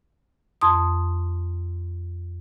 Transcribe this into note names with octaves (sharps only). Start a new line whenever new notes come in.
F2 C6 D#6